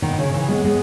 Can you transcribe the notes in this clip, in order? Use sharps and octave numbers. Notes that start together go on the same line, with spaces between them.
B2 D#3
C#3
C#3 E3
G#3 B3
G#3 B3